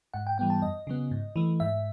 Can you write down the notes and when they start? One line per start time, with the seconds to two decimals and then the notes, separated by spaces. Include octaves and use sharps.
0.14 G#2 F#5
0.27 G5
0.38 E3 G3 B3 G5
0.50 A5
0.62 F#2 D#5
0.87 C#3 F#3 B3
1.11 G#2
1.36 E3 A3
1.60 G#2 E5